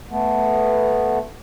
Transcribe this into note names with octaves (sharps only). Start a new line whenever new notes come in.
A3 B3